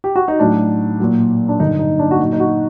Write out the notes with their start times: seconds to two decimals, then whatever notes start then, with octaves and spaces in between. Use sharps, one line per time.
0.04 G4
0.16 F#4
0.28 D#4
0.39 A2 F#3 D4
1.00 A#2 F#3
1.49 D4
1.60 G2 D3 F#3 D#4
1.79 D#4
1.99 D4
2.11 F#4
2.19 A#2 F#3 D#4
2.32 D#4
2.40 F#4